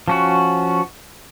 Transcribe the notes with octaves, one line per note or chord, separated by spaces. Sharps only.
F3 C#4 F#4